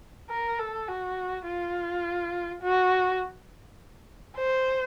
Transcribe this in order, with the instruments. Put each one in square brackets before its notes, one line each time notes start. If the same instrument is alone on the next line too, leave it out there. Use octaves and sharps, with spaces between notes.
[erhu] A#4
A4
F#4
F4
F#4
C5